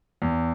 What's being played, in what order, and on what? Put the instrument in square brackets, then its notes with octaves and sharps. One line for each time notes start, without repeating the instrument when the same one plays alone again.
[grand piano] E2